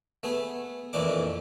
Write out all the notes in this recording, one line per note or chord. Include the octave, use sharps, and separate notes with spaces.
A3 B3 G#4
F2 A#2 E3 A3 D4 D6